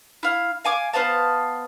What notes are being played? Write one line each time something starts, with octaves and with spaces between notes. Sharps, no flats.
E4 F5
F5 G#5 D6
B3 C5 F5 A5